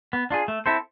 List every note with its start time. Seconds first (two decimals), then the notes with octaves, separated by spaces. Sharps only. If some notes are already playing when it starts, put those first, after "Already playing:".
0.13 B3
0.30 D4 F4 G#4
0.48 A3
0.66 C4 E4 A4 C5